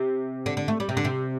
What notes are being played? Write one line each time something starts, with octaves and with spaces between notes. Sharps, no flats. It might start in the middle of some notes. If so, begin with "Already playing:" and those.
Already playing: C3
D3
D3
A3
G3
C3
D3
C3